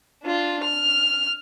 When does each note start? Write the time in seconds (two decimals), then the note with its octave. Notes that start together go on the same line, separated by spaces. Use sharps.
0.23 D4 F4
0.63 F6